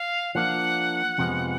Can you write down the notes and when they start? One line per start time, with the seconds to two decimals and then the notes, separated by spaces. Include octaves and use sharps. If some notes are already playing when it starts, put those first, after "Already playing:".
Already playing: F5
0.35 F3 A#3 D4 F#5
1.18 F2 C3 F3 G#3 B3